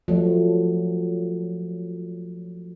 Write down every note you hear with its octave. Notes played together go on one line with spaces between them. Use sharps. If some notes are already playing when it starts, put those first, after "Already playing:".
F3 F#3 A3